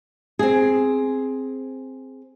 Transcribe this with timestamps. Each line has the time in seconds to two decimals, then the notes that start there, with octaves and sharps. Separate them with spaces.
0.39 C4 G#4